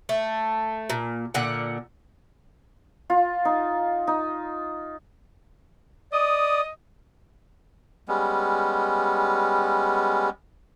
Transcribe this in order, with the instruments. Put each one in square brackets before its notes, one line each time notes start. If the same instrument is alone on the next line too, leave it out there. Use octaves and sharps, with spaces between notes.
[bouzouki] A3
A#2
A#2 D3 F#5
[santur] F4
D#4
D#4
[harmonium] D5 [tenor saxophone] D#5 [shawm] D#6
[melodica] G3 G#3 B3 C#4